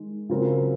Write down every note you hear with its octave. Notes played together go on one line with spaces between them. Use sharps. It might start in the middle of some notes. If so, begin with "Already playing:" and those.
Already playing: D#3 G#3
C#3 F#3 C4 F4 A#4